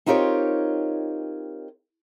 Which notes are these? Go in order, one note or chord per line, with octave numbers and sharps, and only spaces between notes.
C4 D#4 F4 G4 A#4 C#5